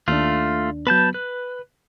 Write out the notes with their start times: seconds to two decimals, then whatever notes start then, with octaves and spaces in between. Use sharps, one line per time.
0.08 D#2 A3 D4 F4
0.87 F#3 B3 B4 A5 G6
1.14 B4 F#6